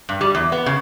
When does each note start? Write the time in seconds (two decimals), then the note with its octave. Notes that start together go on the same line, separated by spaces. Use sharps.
0.09 G2
0.21 G3
0.35 E2
0.52 B3
0.66 C#3